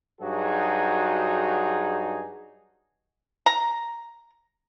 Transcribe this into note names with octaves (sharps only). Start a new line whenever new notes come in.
G2 F#3 D#4 F#4 G#4
A#5